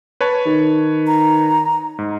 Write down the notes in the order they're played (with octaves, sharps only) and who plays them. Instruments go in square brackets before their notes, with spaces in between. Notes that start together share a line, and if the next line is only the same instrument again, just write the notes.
[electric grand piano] B4 C#5 A5
[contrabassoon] D#3
[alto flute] A#5
[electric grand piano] G#2